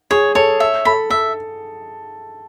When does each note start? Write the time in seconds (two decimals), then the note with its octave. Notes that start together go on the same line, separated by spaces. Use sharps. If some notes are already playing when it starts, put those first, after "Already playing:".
0.11 G#4 C#5
0.35 A4 C#5
0.60 E5
0.85 A4 B5
1.10 A4 E5